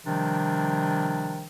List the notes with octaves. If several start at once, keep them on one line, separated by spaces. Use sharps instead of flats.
C3 D#3 F3 G3 D4